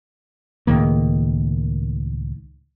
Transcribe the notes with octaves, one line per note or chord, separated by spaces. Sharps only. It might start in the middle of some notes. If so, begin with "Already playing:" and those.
C#2 A2 D#3 A#3